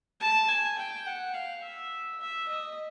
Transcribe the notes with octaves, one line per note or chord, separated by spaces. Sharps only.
A5
G#5
G5
F#5
F5
E5
E5
D#5